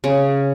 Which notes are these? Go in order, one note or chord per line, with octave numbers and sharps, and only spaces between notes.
C#3